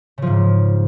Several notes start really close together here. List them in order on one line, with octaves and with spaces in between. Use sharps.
C#3 F3 G#2